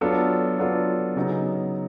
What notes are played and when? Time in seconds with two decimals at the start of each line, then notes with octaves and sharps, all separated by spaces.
0.01 F#3 B3 D4 F4 A4
0.59 F#3 B3 D4 F4 A4
1.16 C#3 F#3 B3 D#4